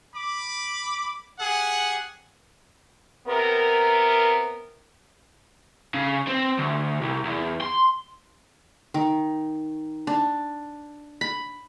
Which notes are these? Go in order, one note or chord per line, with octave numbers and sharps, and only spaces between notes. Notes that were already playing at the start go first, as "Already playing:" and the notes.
B5 D6
G4 G#4 F#5
C3 B3 A#4
C#3
C4
D2
C2
E2
C6
D#3
D4
B5